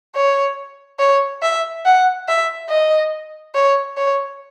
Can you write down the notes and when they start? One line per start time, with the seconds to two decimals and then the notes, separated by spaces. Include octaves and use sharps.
0.15 C#5
0.99 C#5
1.43 E5
1.85 F#5
2.28 E5
2.69 D#5
3.55 C#5
3.97 C#5